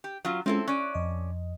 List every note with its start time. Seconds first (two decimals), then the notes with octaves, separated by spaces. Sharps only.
0.04 G4
0.25 F#3 C#4 F4
0.46 G#3 C4 C#4 E4 F4 A4
0.68 C#4 D5 F#6
0.94 F2 D#5